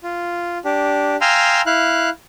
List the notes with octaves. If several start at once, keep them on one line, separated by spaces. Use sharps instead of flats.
F4
D4 G4
F5 G5 G#5 A#5 C6 E6
E4 F5 F#6